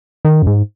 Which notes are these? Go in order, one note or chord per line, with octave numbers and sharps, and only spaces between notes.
D#3
F#2
G#2